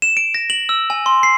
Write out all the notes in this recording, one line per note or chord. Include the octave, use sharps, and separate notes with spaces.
E7
D7
A#6
F#7
E6
G#5
C6
C7